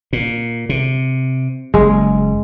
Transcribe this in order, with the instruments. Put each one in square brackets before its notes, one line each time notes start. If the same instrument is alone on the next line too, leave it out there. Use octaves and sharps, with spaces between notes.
[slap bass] A#2
C3
[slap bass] F#1 [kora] G#3